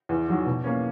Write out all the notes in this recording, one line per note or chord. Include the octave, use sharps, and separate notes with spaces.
E2
D#3 F#3
B2
A#3 C#4